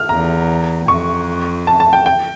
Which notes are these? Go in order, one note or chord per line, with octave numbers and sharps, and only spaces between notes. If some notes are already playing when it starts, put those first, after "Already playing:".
Already playing: F6
E2 A#5
F2 C#6
A5
A5
G5
G5